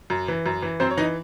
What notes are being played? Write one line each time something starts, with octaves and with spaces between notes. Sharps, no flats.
F#2
E3
F#2
E3
F#2 C4 C5
C#5
E3 D#4 D#5